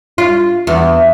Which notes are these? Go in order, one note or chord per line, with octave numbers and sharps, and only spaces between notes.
F4
E2